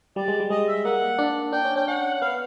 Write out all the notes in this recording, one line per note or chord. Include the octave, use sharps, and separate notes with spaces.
G3 D5
G#3
G3
G#3 D#5
E5
A#3 F#5
D4
D4 G5
C#4
C#4 G5
C#4 F#5
F#5
B3 F5